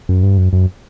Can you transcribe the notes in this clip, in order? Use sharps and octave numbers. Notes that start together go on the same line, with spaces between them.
F#2
G2
F#2
F#2